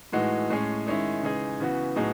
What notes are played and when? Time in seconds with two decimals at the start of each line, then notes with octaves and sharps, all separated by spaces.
0.12 A2 E3 G#3 D#4 F#4
0.50 A2 G#3 C#4 G#4
0.87 D#3 G#3 C#4 E4
1.22 C#3 E3 G#3 D#4 G#4
1.60 C#3 E3 B3 F#4
1.96 A2 F#3 B3 D#4 G#4